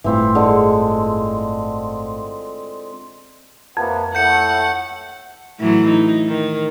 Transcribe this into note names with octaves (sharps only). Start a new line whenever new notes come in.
G1 A2 E3 C4 F4
D3 G#3
F2 C3 A#3 B3
A2 A3 F#5 G6 C#7
A2 E3 F#3
D#4
D#3